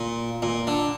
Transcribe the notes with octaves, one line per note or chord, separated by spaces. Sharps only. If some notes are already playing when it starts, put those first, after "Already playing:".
Already playing: A#2
A#2
D3